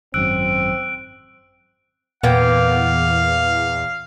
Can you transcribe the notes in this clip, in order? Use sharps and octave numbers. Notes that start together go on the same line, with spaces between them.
G#1 F#2 C4 E6 F#6 D7
E2 A#2 A#3 B3 F5 G5